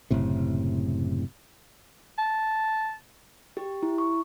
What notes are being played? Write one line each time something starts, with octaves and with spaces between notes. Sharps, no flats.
F#1 A2 C3
A5
G4
E4
C#6